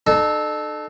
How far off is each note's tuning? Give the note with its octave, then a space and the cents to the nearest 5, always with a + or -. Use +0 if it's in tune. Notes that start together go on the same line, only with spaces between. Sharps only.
D#4 -45 A4 -15